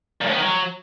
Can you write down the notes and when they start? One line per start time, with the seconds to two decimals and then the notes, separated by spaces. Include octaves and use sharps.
0.21 A#2
0.26 A2
0.32 B3
0.37 D#3
0.42 F#3